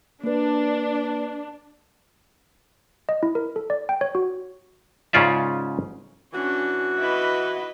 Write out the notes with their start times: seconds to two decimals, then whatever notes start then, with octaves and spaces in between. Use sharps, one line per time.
0.24 A#3 D4 B4
3.09 D#5
3.23 E4
3.35 A#4
3.56 A4
3.70 D5
3.89 G5
4.01 C#5
4.15 F#4
5.13 G#2 C#3 C#4 F4 D5 E5
6.33 E3 C#4 D4 F#4
6.98 E4 B4 D#5